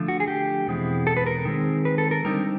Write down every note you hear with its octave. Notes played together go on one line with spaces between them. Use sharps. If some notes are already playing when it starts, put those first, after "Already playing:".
Already playing: D3 F3 A3
F#4
G#4
G4
E2 B2 G#3 C4 E4
A4
B4
A#4
D#3 G#3 C4
B4
A4
A#4
D3 G3 C4 D#4 A#4